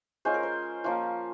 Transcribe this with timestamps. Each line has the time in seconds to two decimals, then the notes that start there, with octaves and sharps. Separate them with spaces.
0.25 G#3 C#4 F4 C5
0.34 A#4
0.43 C5
0.84 F3 A#3 C#4 F4